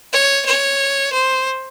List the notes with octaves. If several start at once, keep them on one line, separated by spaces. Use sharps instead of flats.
C#5
C#5
C5